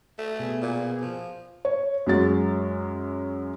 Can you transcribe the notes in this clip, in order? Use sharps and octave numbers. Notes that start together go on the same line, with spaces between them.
A3
B2 G#4
A#2
F3
C#5
F#2 F#3 G#3 A6